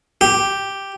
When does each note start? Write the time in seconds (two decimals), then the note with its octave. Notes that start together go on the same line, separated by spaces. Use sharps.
0.21 G4